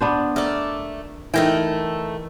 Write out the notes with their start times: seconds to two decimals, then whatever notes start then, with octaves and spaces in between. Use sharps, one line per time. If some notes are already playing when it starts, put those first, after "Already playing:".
0.01 B3 D4 C5
0.36 A3 A#4 D5
1.34 E3 A3 D#4 A#4 G5